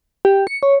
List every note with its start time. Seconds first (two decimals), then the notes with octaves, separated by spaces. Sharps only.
0.25 G4
0.47 C#7
0.63 C#5